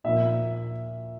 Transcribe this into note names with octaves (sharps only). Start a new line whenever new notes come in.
A#2 F3 A#3 E5